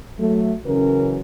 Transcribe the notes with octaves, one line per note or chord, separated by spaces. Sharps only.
F#3 A3
C#3 E3 F#3 C#4 A#4